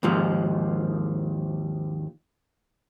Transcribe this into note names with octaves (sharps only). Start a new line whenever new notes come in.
D#2 G#2 F3